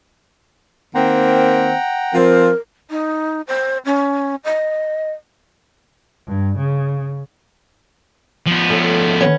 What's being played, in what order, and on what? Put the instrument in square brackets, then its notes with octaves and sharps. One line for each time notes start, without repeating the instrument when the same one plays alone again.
[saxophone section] D#3 A#3 C4 [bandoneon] F#5 G5 A#5
[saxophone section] F3 C4 [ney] A#4
[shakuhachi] D#4
C5
C#4
D#5
[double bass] G2
C#3
[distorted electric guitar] F3 B3
[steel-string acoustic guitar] A3 C#4
C#4 B4 F#5